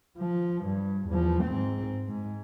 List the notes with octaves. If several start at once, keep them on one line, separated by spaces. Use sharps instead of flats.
F3
G2
E2 F3
G#2 C4
G#2